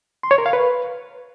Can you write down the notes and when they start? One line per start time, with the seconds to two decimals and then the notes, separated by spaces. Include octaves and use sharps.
0.23 C6
0.31 C#5
0.38 A#4
0.46 F5
0.53 B4